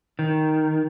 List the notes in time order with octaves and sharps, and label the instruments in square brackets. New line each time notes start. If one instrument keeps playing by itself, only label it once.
[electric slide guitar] D#3